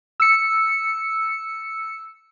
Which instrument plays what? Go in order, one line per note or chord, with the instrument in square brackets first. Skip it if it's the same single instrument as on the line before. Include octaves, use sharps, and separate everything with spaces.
[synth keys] E6 C#7